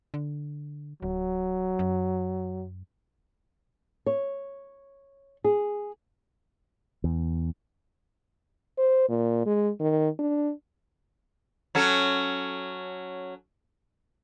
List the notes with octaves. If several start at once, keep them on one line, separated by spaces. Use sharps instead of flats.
D3
D1 F#3
F#2
C#5
G#4
E2
C5
A#2
G#3
D#3
D4
F#3 C#4 A4